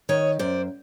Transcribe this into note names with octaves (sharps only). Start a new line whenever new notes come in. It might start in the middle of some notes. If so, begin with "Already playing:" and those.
D#3 C#5 D#5
F#2 C5 D5